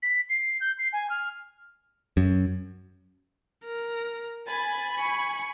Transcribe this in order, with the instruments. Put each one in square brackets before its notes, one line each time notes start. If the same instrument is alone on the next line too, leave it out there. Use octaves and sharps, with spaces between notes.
[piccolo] B6
C7
G6
C7
G#5
F6
[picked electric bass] F#2
[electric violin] A#4
[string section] G#5 B5 [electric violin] A6
[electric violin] C#6